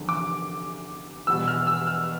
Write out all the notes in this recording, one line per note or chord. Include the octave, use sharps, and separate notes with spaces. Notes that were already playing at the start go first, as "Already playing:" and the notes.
Already playing: F1 E2 D3
D6
E1 E2 B2 G3 E6
F6
E6
F6